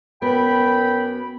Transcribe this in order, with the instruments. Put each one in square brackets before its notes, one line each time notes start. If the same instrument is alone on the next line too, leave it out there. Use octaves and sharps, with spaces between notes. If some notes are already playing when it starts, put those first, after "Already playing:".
[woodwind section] F#2 G5 B5 [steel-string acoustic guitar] B3